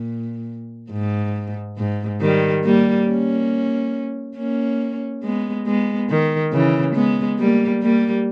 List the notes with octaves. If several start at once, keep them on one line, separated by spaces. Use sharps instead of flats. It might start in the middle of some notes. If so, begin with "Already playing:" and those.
Already playing: A#2
G#2
G#2
D#3 G3
G3 A#3
A#3 C#4
A#3 C#4
G#3 B3
G#3 B3
D#3
C#3 E3
G#3 B3
G3 A#3
G3 A#3